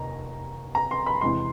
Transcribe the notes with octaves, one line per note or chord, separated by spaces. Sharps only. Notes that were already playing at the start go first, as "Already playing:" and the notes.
Already playing: F1 D#2 D#3 A#5
A#5
C6
B5
E2 C3 E3 G#3 C6